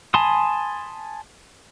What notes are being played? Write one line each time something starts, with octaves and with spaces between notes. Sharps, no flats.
G#5 A5 B5 C6 D#6